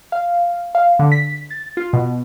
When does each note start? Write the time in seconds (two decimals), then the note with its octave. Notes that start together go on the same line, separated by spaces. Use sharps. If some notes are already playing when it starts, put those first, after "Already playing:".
0.12 F5
0.75 F5
0.99 D3
1.12 B6
1.51 A6
1.77 F4
1.93 B2